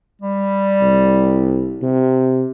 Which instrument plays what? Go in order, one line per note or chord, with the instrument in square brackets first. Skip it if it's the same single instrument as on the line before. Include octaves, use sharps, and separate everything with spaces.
[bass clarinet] G3
[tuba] C2
C3